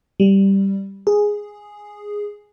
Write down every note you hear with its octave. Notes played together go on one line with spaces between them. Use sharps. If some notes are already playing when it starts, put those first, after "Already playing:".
G3
G#4